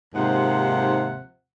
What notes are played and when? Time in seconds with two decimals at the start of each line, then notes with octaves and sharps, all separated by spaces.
0.15 D#2 G#2 C3 F3 C5 F#5